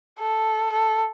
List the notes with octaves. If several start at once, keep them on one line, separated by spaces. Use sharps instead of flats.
A4
A4